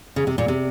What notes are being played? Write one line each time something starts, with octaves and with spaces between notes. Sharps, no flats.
C#3
C3
A#2
C3